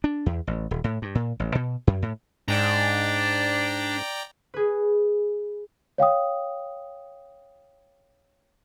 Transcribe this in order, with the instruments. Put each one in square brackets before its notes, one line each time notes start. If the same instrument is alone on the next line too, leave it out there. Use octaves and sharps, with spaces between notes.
[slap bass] D4
E2
A1
D#1
A2
G2
A#2
A1
B2
F#2
A2
[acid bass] G#2 [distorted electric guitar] D4 [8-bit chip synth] D5 G5 A#5
[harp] G#4 B4
[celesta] C#5 F5 G5 D#6